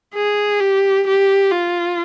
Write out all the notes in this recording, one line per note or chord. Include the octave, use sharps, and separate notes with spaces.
G#4
G4
G4
F4